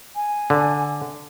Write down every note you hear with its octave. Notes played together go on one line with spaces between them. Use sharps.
G#5
D3